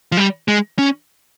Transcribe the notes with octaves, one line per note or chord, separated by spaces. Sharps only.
F3
G3
G#3
C#4